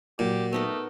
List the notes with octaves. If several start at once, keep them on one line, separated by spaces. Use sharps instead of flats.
A#2 F#3 G4
A3 B3 D#4 A#4